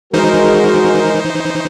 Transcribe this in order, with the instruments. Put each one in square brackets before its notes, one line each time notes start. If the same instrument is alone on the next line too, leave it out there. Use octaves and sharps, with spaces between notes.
[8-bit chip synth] E3 D#4 C5 [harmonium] G#3 A#4 [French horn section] F#4 G#4